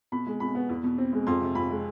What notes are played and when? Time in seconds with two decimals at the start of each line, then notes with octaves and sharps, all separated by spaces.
0.12 B2 B5
0.27 G#3
0.40 B2 B5
0.55 B3
0.69 E2
0.84 B2
0.98 C4
1.13 G#3
1.27 F2 C6
1.41 C3
1.55 F2 B5
1.70 G#3